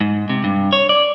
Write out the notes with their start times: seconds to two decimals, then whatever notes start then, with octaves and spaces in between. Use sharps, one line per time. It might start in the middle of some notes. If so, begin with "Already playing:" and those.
0.01 G#2
0.30 C3
0.44 G2
0.73 C#5
0.89 D5